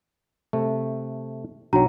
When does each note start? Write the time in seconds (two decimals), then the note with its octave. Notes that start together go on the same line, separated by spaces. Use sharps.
0.53 C3 A3
1.73 B1 F#3 D4 F#4 A#5